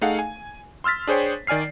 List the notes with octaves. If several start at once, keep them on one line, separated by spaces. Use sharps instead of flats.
A3 D#4 G#4 F5 F#5
G#5
C6 E6 F6 A6 B6
D4 G#4 C5 C#5 G5
D#3 D5 G#5 F6 C7